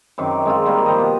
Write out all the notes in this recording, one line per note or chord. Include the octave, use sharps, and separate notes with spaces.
F#2 D#3 C4 D6
G#3 C4 F4
D#3 G3 A#3 E5
F3 G4 D#5
B2